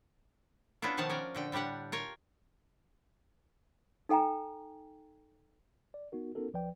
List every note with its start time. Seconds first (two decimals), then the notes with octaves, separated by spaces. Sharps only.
0.82 B3 C#4 D4 E4 F4
0.97 B2 D#3 F3 F5 F#5 A5
1.10 C#4 A#4 D5
1.35 A#2 D3 G5
1.52 A2 G3 D4 G4 F#5
1.92 F4 A#4 C#5
4.09 D#4 A4 G5 G#5 A#5
5.94 D5
6.12 B3 D#4 F#4 A#4
6.35 B3 C#4 D#4 F#4 A4 A#4
6.53 C#2 F3 B4 D5 G5